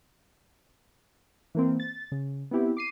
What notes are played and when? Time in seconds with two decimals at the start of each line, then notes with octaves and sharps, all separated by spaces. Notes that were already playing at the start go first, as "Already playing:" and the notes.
1.55 E3 A#3 C4
1.80 A6
2.12 C#3
2.51 B3 C4 E4 G4
2.77 D6 C7 D#7